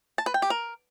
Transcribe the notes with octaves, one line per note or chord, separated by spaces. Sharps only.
A5
B4
G5
G4
A#4